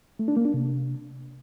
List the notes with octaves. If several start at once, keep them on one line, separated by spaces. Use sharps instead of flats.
A3
D4
A#3
D4
C3